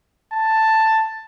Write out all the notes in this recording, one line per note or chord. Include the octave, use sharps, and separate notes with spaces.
A5